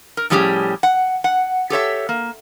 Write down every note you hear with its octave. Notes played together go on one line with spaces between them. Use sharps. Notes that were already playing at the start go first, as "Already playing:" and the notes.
A#4
A2 F3 G3 C#4 G4 G#4
F#5
F#5
G4 A4 C#5 E5
A#3